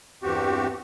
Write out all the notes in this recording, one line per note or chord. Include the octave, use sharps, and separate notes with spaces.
E2 G2 C4 F#4 G4